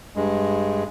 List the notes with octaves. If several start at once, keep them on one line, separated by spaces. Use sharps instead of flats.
G2 G#3